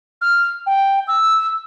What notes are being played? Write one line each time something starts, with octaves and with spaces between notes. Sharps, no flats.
F6
G5
E6